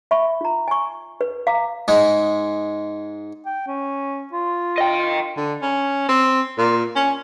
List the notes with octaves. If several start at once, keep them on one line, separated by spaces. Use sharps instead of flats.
E5 B5 C#6
F4 A#5
G#5 C#6
B4
F5 A#5 D6
G#2 G#3
G5
C#4
F4
D#5 G5
D3
C#4
C4
A#2
C#4